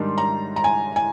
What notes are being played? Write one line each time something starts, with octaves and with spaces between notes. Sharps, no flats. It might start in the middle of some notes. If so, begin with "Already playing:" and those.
Already playing: G#2 D#3 G3 D4 C6
A#5
A#5
G#5
G#5